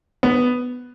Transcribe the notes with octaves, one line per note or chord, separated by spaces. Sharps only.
B3